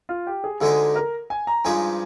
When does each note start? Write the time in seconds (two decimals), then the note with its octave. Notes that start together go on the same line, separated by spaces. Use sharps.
0.09 F4
0.27 G4
0.44 G#4
0.61 D2 D3 G#3 D#4 G4 G#4
0.96 A#4
1.30 G#5
1.47 A#5
1.65 G2 F3 G#3 D#4 G4 G#5